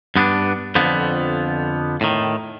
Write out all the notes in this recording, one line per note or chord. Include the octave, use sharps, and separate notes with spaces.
G2 B3 C#4 D4
F2 D3 F3 B3
A2 D#3